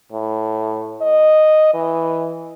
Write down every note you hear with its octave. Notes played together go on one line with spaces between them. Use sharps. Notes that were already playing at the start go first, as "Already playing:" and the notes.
A2
D#5
E3